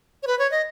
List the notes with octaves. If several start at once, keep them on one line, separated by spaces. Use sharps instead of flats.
C#5
B4
C#5
D#5